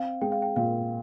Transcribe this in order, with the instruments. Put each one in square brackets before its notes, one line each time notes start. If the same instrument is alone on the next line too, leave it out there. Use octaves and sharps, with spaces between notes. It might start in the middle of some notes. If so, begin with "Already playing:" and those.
Already playing: [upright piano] C4 [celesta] F5
[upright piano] G#3 [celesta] G5
[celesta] F5
G5
[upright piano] A#2 [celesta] F5